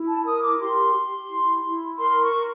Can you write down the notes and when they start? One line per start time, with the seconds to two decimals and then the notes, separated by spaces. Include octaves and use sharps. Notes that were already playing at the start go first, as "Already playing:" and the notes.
Already playing: E4
0.08 A5
0.25 A#4 D#6
0.43 D6
0.60 G4 C6
0.96 G4
1.30 E4
1.64 E4
1.99 A#4 C6
2.22 C#6
2.34 A#4